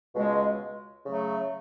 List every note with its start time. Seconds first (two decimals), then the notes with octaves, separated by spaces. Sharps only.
0.14 C#2 B2 G#3
1.05 C#3 F#3 A3